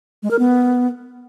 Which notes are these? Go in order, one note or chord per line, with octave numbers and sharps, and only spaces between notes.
G#3
A#4
B3